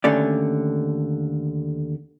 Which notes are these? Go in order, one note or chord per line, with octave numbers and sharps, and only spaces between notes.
D#2 D3 A3 C#4 D5